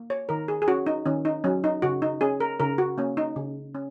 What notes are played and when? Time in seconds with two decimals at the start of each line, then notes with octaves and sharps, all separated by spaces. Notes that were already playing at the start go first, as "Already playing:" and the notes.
Already playing: A#3
0.10 C#5
0.29 D#3 A#4
0.48 G#4
0.62 G#4
0.68 C#4 F#4
0.87 D#4
1.06 D#3 C#4
1.25 D#4
1.44 F#3 C#4
1.64 D#4
1.82 C#3 F#4
2.02 D#4
2.21 C#4 G#4
2.40 A#4
2.60 C#3 A#4
2.78 F#4
2.98 A#3 C#4
3.17 D#4
3.36 C#3
3.75 C#4